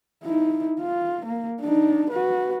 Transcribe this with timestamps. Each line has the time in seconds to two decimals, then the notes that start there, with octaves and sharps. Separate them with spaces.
0.24 D#4 E4
0.80 F4
1.25 A#3
1.61 D4 D#4
2.10 F#4 B4